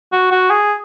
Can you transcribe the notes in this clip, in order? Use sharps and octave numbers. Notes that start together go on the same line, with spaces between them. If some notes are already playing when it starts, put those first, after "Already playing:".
F#4
F#4
G#4